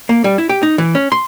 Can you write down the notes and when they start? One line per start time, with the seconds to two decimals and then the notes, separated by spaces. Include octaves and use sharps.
0.09 A#3
0.24 G3
0.38 E4
0.49 G4
0.63 D#4
0.78 E3
0.95 C#4
1.12 C6